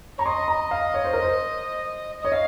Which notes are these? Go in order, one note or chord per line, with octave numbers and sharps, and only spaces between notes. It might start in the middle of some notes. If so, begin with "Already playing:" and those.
C#5 A#5
D#5 C6
A#5
F5
C#5
C5
A#4
C5
C#5 D#5
D#5 F5